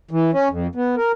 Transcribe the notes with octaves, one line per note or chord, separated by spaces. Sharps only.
E3
C#4
F2
B3
A#4